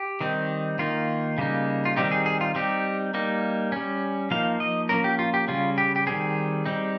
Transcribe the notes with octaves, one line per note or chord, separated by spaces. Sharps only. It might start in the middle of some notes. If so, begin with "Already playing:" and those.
Already playing: G4
D#3 G3 C4 D#4
D#3 A#3 D#4 F4
C#3 G3 A#3 D#4
F4
D#3 G3 C4 D#4 G4
G#4
G#4
F4
G3 C4 D#4 G4
G3 A#3 D#4
G3 C#4
F3 A#3 D#4 F5
D#5
F3 A#3 C#4 A#4
G4
F4
G4
C#3 G3 C#4 F4
G4
G4
D#3 G3 C4 G#4
G3 C4 D#4